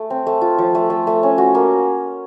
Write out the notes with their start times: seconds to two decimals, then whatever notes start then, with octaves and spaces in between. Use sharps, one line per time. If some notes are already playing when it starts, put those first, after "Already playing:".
Already playing: A3
0.10 C4
0.27 A3
0.41 F4
0.58 F3
0.75 A3
0.90 A3
1.07 A3
1.23 C#4
1.38 F#4
1.55 A#3